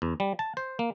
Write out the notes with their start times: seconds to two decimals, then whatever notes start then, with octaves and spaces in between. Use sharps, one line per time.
0.02 E2
0.20 G3
0.39 A5
0.57 C5
0.79 A#3